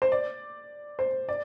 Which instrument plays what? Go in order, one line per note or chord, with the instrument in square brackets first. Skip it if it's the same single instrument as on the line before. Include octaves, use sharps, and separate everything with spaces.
[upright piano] C5
D5
C5
D5